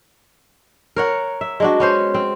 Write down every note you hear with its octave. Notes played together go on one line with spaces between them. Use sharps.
A#4 C#5 F#5
E5
G#3 D4 F#4
B3 C#4 C5
C4